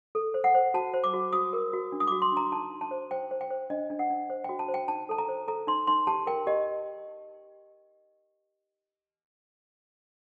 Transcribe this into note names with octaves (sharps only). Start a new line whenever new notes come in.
A4
C5
F#5
C5
F#4 A5
C5
D6
F#4
F#4 D#6
A#4
F#4
D4
D#6
F#4 D6
C6
D4 A#5
D#4 A5
D#4
A5
C5
C5 G5
C5
G5
C5
D4 D#5
D4
F#5
D4
C5
F#4 G5
A5
C5
G5
D#4 A5
A4 A5
A#5
C5
A4 A#5
D#4 C6
D#4 C6
G4 A5
A#4 G5
G4 D#5